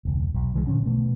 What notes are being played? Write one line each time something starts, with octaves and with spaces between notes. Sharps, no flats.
E1 C#2
B1
C#2 E3 G#3
A#2 D3 F3 C#4
B2 A3 B3